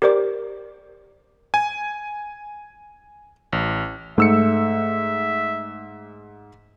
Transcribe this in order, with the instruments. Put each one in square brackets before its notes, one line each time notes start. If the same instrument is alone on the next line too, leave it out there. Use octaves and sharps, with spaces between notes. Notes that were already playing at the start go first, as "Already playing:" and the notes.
[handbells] G4 A#4 C5 D5 D6
[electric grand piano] G#5
A1
[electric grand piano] G#2 E6 C#7 [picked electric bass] A3 [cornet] E5